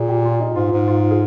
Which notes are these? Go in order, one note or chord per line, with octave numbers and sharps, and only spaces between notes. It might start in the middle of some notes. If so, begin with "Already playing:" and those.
Already playing: A#2 G#4
G4
F4
D#4
G#2 F4
G#2
F4
G#4